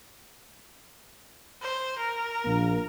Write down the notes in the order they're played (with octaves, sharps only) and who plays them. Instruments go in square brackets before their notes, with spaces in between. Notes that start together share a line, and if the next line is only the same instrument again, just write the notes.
[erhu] C5
A#4
[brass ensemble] A#1 A#3